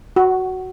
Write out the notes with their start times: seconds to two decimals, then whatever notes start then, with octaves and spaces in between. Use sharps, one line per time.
0.16 F#4